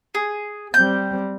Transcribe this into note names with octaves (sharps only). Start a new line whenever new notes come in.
G#4
G3 C4 G6